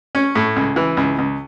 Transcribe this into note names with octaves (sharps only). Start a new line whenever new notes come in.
C#4
A2
C#2
E3
C#2
C#2